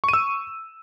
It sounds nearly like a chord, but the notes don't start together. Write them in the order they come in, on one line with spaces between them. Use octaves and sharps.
C#6 D#7 E6